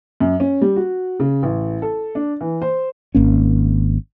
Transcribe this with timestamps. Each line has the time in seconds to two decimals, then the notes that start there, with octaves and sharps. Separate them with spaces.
0.20 F#2
0.40 C#4
0.62 G3
0.76 F#4
1.20 C#3
1.43 A1
1.82 A4
2.15 D4
2.41 E3
2.62 C5
3.15 G#1 A#3 C#4